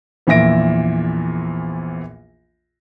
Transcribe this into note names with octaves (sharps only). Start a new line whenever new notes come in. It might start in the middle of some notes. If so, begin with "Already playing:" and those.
A#1 E2 A#2 E5 A#6 D7